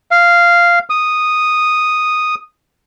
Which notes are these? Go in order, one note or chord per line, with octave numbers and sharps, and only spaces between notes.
F5
D#6